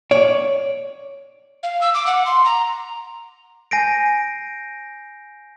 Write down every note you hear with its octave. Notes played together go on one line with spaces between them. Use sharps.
C#5 D5
F5
E6
D6
F#5
C6
A#5
G#5 G6 A#6 C7 D7